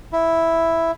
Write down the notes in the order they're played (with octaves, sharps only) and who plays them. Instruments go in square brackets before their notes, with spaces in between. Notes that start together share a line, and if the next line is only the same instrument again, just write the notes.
[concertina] E4